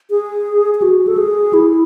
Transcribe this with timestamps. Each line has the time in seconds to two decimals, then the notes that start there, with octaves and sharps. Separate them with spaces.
0.10 G#4
0.75 G#4
0.82 F#4
1.07 A4
1.18 G#4
1.53 E4